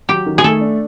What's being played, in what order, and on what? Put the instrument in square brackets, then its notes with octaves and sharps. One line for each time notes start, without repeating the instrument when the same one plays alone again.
[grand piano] F#3 [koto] G4
[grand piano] D#3
[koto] G#4
[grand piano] A3 [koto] A4
[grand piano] D4